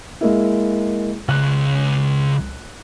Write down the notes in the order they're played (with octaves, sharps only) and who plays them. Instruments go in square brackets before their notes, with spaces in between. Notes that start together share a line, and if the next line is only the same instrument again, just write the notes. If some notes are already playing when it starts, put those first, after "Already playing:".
[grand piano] G#3 A#3 E4
[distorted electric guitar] C#2 [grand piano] F#6